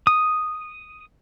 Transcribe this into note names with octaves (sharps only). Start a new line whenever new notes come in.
D#6